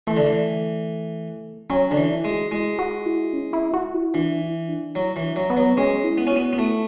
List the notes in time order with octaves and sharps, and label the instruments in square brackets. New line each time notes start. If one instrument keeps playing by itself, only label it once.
[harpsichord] E3 [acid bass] A3
[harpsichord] D3
E3
[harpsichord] F#3 [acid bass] C#4
[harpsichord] D3 [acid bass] D4
[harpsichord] E3
[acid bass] E4
[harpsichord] G#3
[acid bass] F#4
[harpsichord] G#3 [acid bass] E4
[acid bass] F#4
E4
C#4
E4
F#4
E4
[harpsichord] E3 [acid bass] D4
[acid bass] E4
D4
[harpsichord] F#3 [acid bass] E4
[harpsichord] E3
[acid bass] D4
[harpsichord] F#3
[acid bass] B3
[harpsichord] F#3
[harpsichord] G#3 [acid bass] C#4
[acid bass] E4
[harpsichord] B3
C#4
[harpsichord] B3 [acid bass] F#4
[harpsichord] B3
[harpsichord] A3 [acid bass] E4